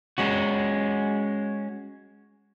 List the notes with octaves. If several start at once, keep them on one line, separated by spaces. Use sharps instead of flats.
G#3 C#4 F#4